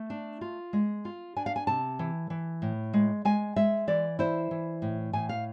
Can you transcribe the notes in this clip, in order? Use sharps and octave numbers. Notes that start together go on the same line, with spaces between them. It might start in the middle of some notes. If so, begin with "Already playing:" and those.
Already playing: A3
D4
F4
G#3
F4
D4 G#5
F5
G#5
C3 A5
E3
E3
A2
G#3
G#3 G#5
G#3 E5
E3 D5
E4 C5
E3
A2
A2 G#5
F5